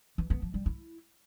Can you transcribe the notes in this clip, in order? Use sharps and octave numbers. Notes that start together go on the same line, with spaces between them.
E3
B3
F3
G3
E4